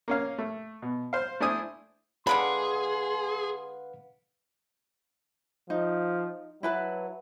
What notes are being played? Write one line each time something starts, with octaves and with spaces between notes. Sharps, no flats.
A#3 C#4 F5
A3
B2
C5 F5
A3 D4 E4 C5 G#5 D#6
D3 G#3 G#4 B4 F5 F#5 B5 C6
F3 D#4
F#3 E4 B4 A5